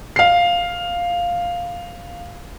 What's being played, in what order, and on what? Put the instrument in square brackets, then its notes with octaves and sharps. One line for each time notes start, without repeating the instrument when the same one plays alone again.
[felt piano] F5 C7